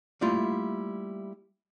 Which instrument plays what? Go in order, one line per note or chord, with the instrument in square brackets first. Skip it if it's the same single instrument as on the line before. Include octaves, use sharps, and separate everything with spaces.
[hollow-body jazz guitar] G3 A3 A#3 E4 F4